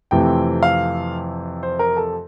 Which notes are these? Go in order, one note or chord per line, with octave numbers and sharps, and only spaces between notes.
F2 C3 E3 A3 G5
F5
C5
A#4
A4